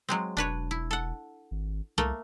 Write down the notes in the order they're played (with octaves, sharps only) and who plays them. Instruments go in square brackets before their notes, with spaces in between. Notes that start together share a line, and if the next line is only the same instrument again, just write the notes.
[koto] F#3 G#3 C4
[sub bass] E1 [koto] D4 B4 C#5
[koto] E4
A4 F#5
[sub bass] G#1
[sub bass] C2 [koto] A3 A#3 A4